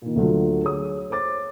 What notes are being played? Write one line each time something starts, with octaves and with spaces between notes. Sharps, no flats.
A#2 D#3
D2 D3 F#3 F4
G#4 C#5 D#6
C5 C#5 D6 A6